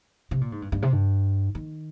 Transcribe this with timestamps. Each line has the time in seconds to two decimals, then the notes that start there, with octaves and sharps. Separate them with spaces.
0.31 C3
0.41 A#2
0.52 G#2
0.62 G2
0.72 G2
0.82 C3
0.93 G2
1.55 D#3